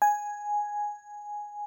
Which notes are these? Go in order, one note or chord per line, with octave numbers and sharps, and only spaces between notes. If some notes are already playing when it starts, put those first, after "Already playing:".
G#5